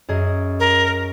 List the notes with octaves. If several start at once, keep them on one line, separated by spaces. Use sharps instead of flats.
F#2 G#4 D#5
A#4